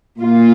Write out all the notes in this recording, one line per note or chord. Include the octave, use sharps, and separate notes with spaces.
A#2 A#3 F4